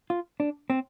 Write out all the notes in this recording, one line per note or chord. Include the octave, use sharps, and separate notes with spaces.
F4
D4
C4